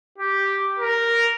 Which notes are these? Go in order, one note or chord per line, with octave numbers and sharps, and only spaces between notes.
G4
A#4